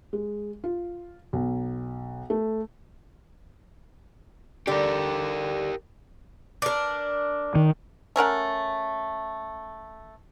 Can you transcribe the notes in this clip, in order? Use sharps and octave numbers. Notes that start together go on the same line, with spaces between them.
G#3
F4
B1
A3
D3 G3 G4 A#4
D4 A#4
D#3
A3 C#4 A#4 F#5